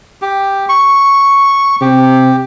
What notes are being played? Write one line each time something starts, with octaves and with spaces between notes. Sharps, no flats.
G4
C#6
C3 G4